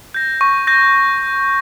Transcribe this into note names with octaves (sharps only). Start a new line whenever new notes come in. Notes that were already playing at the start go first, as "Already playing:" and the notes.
G6 A#6
C#6
G6 A#6